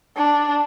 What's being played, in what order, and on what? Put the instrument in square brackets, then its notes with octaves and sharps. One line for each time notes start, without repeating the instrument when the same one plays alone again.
[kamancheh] D4